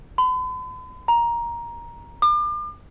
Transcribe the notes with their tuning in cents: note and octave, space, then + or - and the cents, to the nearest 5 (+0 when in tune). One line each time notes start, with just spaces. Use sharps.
B5 +45
A#5 +10
D6 +40